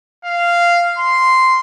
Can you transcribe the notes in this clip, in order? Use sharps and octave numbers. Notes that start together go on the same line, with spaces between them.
F5
C6